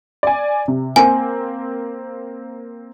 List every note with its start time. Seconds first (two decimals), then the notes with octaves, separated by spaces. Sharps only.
0.23 D5 G#5
0.68 C3
0.96 A#3 C4 G#5